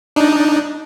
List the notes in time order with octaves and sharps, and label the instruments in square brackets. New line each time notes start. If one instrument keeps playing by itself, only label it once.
[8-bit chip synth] D4 D#4